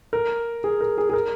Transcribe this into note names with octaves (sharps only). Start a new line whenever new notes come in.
A#4
G#4
A#4
G#4
G#4
A#4